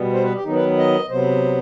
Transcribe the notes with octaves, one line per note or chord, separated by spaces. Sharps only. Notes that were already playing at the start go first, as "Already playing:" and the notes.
Already playing: B2 G3 B3
C5
B4
G4
D#3 F#3 B3 D#4
B4
D#5
C3 F#3 B3 C5